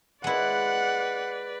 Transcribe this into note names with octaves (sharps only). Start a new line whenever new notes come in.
G#3 E4 B4 D5 F#5